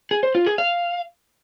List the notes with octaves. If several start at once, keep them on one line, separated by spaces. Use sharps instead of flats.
G#4
C5
F4
G#4
F5